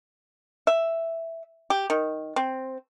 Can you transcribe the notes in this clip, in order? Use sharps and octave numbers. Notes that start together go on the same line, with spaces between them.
E5
G4
D#3
C4